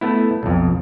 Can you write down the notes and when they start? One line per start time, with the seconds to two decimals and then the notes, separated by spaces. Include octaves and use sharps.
0.01 A3 B3 E4
0.43 B1 F2